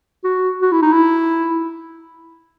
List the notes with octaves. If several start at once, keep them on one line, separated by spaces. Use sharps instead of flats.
F#4
F#4
E4
D#4
E4